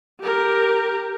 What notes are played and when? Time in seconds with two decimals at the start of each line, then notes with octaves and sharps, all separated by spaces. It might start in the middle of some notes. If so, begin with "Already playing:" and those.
0.21 G4 A#4